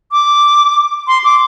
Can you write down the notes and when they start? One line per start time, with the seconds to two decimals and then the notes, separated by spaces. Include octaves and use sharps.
0.12 D6
1.07 C6
1.24 D6